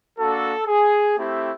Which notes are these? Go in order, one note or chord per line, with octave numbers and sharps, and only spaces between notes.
A#3 D4 F#4 A4
G#4
A3 C4 E4 G4